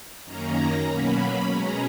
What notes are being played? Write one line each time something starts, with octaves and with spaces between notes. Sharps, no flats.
F#2 D#3 A#3 C#4 A#5
B2 F#3 A#3 C#4 B5
B2 G#3 C#4 A#5